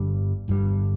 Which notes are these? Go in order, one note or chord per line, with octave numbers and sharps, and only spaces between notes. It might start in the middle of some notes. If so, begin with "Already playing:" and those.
Already playing: G1 G2 G3
G1 G2 D3 G3